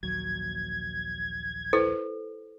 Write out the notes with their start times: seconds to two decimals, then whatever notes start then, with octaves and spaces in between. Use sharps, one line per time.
0.03 A#1 D#2 F#3 G#6
1.73 E4 A4 B4 C5